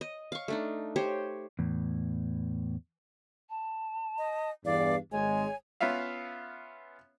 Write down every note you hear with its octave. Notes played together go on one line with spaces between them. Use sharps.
D#5
F5 C#6
A3 D4 D#4
G4 C5 C#5
E2 A2
A5
D#5
E2 G2 D5 F5
G#1 G#3 C#5 G#5
B3 C#4 F4 E5 F5